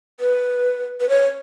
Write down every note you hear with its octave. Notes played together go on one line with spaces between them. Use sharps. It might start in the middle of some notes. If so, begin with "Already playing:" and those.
B4
B4
C#5